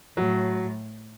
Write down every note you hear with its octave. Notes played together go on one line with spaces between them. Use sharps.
A2 F#3